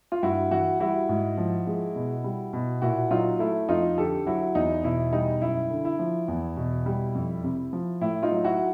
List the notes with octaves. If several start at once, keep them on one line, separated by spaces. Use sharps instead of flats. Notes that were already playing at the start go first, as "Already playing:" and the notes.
F4
G2 E4 F#4
E3 E4 F#4
G3 E4 F#4
G#2
F3
G#3
B2
G3
B2
A#2 E4 F#4
F#3 D#4 F4
A3 E4
F2 D#4 F4
D3 G4 A4
F#3 E4 F#4
E2 D#4
B2 E4
G3 D#4
F#2 E4
D3
E4
F3
E2
B2
G3
F2
C3
F3
A2 E4
D#4 F4
F#3
E4 F#4